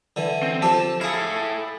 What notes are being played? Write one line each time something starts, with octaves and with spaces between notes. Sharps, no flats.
D3 E3
C4
F3 G4 A4 A5
E4 G#4 A4 F5